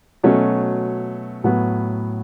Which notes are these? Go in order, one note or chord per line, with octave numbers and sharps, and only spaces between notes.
B2 F#3 A3 C#4
A2 F#3 B3